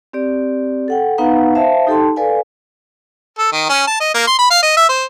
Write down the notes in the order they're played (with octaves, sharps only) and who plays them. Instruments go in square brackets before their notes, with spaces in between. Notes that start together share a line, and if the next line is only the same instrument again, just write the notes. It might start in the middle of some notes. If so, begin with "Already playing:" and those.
[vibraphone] C4 G4 D5
A4 F#5 G5
B3 D#4 B4 F5 F#5 A#5
C5 E5 F5 A5
D#4 G4 A4 G5 A5 C6
A4 B4 D5 F5 G#5
[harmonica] A4
D#3
C#4
A5
D#5
A#3
C6
B5
F5
D#5
E5
C5